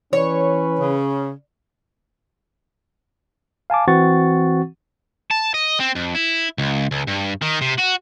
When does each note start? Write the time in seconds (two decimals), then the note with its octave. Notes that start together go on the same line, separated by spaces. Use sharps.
0.13 E3 C#4 B4 C#5
0.80 C#3
3.70 F5 G#5 A5 D6
3.88 E3 C4 F#4 F#5 C#6 A6
5.31 A5
5.54 D#5
5.80 C4
5.95 F2
6.15 E4
6.58 C#2
6.91 C#2
7.08 G2
7.42 D#3
7.61 C3
7.78 F#4